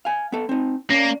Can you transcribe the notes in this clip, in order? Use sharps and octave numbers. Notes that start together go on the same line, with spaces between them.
F5 G#5
B3 A4
C4 D#4
A#3 C#4 D5